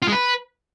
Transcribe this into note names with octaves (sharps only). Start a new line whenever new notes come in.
F4
G#3
B4